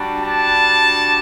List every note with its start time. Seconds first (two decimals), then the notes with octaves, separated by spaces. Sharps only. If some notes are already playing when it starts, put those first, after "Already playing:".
Already playing: G3 D4 F#4
0.22 A5